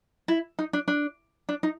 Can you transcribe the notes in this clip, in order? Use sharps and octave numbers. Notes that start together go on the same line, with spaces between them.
E4
D#4
D4
D4
D4
D#4